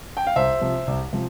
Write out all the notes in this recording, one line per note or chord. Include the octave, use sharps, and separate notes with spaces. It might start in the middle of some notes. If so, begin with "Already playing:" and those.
G5
F5
C2 C5 E5
C3 F3
C2
C3 F3